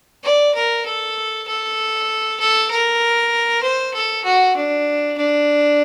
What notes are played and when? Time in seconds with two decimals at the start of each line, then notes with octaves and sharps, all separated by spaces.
0.24 D5
0.54 A#4
0.85 A4
1.47 A4
2.40 A4
2.71 A#4
3.63 C5
3.94 A4
4.24 F#4
4.56 D4
5.17 D4